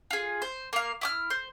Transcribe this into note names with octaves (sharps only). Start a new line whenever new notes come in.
F4 G#4
C5
A#3 F5
E4 D6 F6
C5